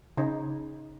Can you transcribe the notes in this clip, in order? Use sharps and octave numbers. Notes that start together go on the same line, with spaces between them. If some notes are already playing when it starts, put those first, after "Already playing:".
C#3 D#4